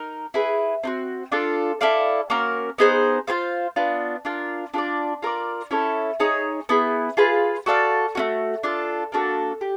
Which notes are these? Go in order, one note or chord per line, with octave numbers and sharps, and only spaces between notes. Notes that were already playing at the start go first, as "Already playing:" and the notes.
Already playing: D#4 A#4
E4 G#4 B4
C4 D#4 F#4
D4 F4 A4
E4 A4 D5 F5
A#3 C#4 F#4 A#4
B3 D#4 G#4 C5
F4 G#4 C5 F5
B3 D4 F4
D4 F4 A#4
D4 F4 A4 D5
F4 A#4 D5
C#4 E4 A4 C#5
D#4 G#4 C#5
B3 E4 G#4
F4 G#4 B4
F#4 A4 D5 F5
A3 C#4 F#4
D4 F4 A4
A#3 D4 F#4 A4
G4